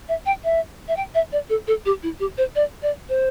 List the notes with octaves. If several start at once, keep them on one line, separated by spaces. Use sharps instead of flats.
E5
G5
E5
E5
G5
E5
D5
A4
A4
G4
E4
G4
C5
D5
D5
C5